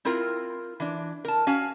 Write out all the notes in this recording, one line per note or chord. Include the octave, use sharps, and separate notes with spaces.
C4 E4 F4 A#4
E3 D4
A#4 A5
C#4 F#4 F5 G#5